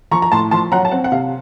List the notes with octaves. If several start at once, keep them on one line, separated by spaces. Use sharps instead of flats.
F3 A#5 C#6
A#5
A2 A5 C6
F3 A5 C6
F#3 F#5 A#5
A5
C4 F#5
F#5
C3 F5